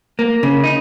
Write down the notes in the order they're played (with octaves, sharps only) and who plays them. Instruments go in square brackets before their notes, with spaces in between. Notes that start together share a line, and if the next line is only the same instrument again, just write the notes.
[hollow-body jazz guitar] A#3
C#3
D#4